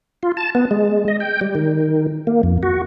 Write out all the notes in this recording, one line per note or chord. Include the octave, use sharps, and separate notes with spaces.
F4
A5
B3
G#3
D#5
G5
G3
D#3
A#3
F2
F#4